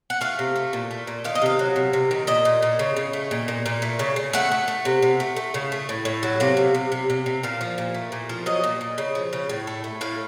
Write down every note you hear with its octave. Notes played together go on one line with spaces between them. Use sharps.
F#5
A3 F5
C3
A3
A#2
A3
A#2
D#3 F5
D#5
C3 F5
F#3
C3
C3
D#3
A#2 D#5
A#2
A#2
C#3
C#3
A3
A#2
A#2
A#2
A3
C#3
C#3
A3 F#5
A3
A3
C3
C3
A3
A3
C#3
A3
A2
A2
F#3
C3 F5
C3
C3
C3
C3
C3
A#2 F5
F3
A#2
A3
A#2
F3
F#3 D#5
A#2
A#2
C#3
F3
C#3
A2
A3
A3
A2 F5